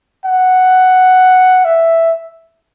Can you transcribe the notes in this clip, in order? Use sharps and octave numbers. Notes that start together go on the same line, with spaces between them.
F#5
E5